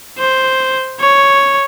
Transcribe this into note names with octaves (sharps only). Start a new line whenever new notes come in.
C5
C#5